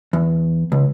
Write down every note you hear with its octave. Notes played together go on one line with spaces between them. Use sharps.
E2
C#2